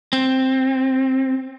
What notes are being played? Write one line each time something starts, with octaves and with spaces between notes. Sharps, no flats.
C4